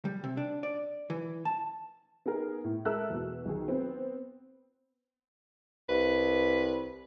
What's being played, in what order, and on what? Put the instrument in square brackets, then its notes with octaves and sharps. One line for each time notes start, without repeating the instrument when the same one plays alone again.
[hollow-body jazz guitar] G3
C3
D4
D5
E3
A5
[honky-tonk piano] B3 D#4 G#4 A#4
A2
G#3 A4 A#4 E5 E6 F#6
E2 B2
B1 D#3 G#4
B3 C4
[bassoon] C2 [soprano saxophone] B4